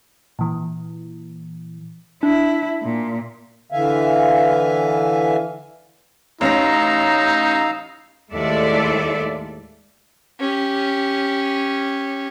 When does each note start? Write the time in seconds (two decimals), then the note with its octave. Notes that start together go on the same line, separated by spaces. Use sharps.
0.39 A#2 E3
2.23 D4 E4
2.82 A#2
3.72 D3 E3 E5 F5 G#5
6.41 A1 C#4 D#4 F5 A#5 E6 A#6
8.32 D#2 A2 G#3 A4 D5 E5
10.40 C#4 G4